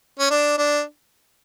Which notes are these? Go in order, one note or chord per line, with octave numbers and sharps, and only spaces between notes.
C#4
D4
D4